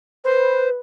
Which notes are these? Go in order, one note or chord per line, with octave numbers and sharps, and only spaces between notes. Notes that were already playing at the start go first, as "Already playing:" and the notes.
B4 C5